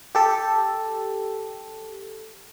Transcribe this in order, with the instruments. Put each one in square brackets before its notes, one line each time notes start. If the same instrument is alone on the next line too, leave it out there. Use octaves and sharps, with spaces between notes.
[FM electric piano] G4 A4